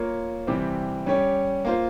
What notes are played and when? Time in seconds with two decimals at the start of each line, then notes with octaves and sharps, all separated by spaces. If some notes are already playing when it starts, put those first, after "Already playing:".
Already playing: A#3 F4 A#4 C#5
0.47 C3 E3 G3 C4 G4
1.06 G3 C#4 G4 C#5
1.65 A#3 F4 C5